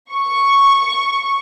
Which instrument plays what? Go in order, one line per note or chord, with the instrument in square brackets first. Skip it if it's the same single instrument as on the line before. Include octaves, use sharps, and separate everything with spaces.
[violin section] C#6